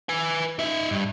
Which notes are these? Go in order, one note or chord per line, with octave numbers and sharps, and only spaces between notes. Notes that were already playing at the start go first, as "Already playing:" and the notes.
B4 G#5
D#4 E5
G2